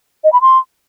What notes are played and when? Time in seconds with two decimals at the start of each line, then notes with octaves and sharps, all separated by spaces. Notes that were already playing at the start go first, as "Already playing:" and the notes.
0.24 D#5
0.33 B5
0.41 C6